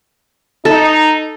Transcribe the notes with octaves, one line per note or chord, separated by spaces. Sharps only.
D#4 A4